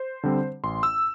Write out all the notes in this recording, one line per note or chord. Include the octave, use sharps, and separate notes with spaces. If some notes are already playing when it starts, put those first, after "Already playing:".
Already playing: C5
D3 G3 C4
A1 C6
E6